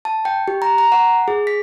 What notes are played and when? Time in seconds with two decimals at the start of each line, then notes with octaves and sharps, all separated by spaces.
0.05 A5
0.25 G5
0.48 G4
0.62 A#5
0.78 A#5
0.92 F#5
1.28 G#4
1.47 B6